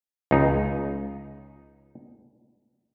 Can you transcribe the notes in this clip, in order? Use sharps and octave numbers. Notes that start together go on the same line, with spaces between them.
C#2 D#4